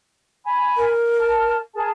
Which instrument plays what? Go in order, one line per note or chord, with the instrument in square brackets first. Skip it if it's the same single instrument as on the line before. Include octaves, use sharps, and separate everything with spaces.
[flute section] G#5 B5
[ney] A#4
[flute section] A5 F6
G#4 A#4 A5